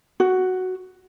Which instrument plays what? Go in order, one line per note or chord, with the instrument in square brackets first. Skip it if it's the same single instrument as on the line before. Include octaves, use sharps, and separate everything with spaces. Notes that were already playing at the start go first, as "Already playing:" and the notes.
[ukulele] F#4